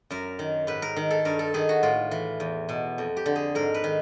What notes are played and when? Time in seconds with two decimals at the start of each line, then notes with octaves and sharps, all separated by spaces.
0.11 F#2 A#4
0.39 D#3
0.67 G#2 B4
0.82 A#4
0.96 D#3
1.10 A4
1.25 G2 A#4
1.39 A4
1.54 D#3 G#4
1.69 F#4
1.83 A2 F4
2.11 E3
2.40 E2
2.69 B2
2.98 F2
3.17 G4
3.26 D3
3.36 G#4
3.55 G#2 A#4
3.74 B4
3.84 D#3